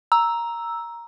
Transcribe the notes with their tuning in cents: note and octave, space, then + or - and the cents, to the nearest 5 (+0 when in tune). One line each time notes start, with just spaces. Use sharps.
A#5 +5 E6 +0